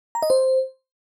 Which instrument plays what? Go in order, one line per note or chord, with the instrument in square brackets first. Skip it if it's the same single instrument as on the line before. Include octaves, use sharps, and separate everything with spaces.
[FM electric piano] A#5
D#5
C5